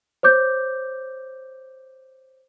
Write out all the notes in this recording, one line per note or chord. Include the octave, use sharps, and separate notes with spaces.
C5 C#5 D6 G6